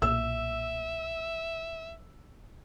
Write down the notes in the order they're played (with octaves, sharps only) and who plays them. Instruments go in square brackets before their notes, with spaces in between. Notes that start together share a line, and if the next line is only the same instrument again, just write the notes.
[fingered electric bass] B1 A#2 [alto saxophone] E5 [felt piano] E6